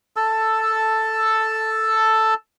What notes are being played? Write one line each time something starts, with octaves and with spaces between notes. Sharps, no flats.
A4 A5 E6